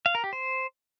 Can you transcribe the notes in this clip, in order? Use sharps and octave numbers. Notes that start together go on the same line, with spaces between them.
F5
A#4
G4
C5